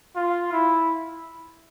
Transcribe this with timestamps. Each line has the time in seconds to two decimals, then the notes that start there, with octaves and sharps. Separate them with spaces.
0.16 F4
0.52 E4